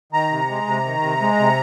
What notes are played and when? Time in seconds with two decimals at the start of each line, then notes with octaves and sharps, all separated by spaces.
0.12 D#3 A#5
0.31 C3
0.49 G#3
0.67 C3
0.85 D#3
1.02 C3
1.21 G#3
1.39 C3